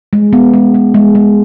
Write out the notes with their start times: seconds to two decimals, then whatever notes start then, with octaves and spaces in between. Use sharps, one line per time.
0.13 G#3
0.33 B3
0.54 G#3
0.74 G#3
0.94 G#3
1.15 G#3